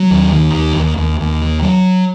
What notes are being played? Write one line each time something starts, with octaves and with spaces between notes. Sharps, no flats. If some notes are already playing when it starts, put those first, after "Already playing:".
Already playing: F#3
D#2
D#3
D#2
D#2
D#2
D#2
D#3
F#3